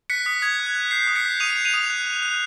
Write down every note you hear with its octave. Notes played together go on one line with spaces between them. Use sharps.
F#6 B6 C#7
D#6 B6
D#6 G#6
F#6
G#6
F#6
G6 C7
D#6
B6 C#7
G6
D#6 D#7 F7
G6
D#7 F7
D#6
F#6
F#6
F#6